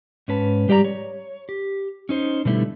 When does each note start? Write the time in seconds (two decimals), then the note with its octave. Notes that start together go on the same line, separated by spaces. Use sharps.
0.28 G#2 C#4 B4 A5
0.69 G3 G4 D5 F#5 A#5
0.84 C#5
1.49 G4
2.09 C#4 D#4 C5
2.45 B2 D3 G3 A3 C#4 E4